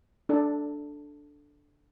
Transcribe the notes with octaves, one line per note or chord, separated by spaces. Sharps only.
D4 A4 D5